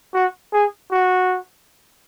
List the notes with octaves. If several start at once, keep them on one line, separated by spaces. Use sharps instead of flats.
F#4
G#4
F#4